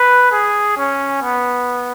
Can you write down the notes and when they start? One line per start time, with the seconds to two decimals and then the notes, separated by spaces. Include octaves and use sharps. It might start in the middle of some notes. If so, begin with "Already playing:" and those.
Already playing: B4
0.32 G#4
0.78 C#4
1.23 B3